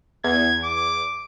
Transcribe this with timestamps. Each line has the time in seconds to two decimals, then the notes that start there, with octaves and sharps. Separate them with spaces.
0.24 E2 G#6
0.64 D6